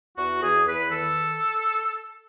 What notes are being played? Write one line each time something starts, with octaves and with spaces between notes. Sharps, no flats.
E2 F#4
E2 G#4
E2 B4
D#3 A4